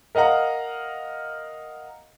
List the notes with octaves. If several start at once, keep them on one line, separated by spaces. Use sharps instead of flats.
A#4 D#5 F5 F#5 A#5